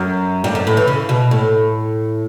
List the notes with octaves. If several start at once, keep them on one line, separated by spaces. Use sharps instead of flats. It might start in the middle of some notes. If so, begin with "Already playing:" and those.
Already playing: F#2
G2
F#2
A2
E3
C#3
B2
A2